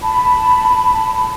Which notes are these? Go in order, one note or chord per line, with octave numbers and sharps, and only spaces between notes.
A5 B5